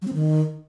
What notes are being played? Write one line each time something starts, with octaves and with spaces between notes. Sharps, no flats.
F#3
C4
D#3